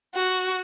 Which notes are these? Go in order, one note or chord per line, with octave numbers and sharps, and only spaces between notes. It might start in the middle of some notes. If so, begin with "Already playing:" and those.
F#4